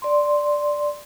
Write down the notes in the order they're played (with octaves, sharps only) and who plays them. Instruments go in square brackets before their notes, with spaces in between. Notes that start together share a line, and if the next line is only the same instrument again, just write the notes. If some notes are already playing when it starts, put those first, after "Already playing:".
[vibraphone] D5 C6